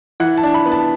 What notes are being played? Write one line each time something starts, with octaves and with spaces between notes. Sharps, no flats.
E3 F#5
A5
D4
B5
B3
A5